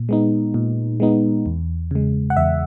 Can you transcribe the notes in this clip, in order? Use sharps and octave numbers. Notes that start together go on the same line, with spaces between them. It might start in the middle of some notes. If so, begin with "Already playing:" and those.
Already playing: A#2
G#3 B3 D#4
A#2
G#3 B3 D#4
E2
C#3 G#3
F#5
E2 E5